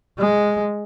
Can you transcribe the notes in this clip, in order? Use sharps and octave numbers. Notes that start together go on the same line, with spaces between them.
G#3